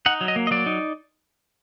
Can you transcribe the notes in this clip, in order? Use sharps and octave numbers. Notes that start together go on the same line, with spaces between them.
D#4 F#5
F#3
D#5
A#3
D#5
F#3 D5
D#4